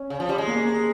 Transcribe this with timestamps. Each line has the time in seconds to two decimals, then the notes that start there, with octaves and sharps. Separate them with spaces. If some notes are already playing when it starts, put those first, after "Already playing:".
Already playing: C#4
0.10 C#3
0.20 F3
0.29 G3
0.38 G#3
0.47 A#3